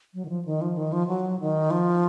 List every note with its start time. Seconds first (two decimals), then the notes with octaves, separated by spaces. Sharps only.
0.14 F#3
0.25 D#3
0.29 F3
0.45 D#3
0.61 F3
0.77 D#3
0.92 F3
1.08 F#3
1.40 D#3
1.71 F3